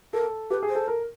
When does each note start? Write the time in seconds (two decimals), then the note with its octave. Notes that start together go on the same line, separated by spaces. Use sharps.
0.13 A4 A#4
0.50 G4 B4
0.63 G#4
0.69 C5
0.75 A4
0.88 A#4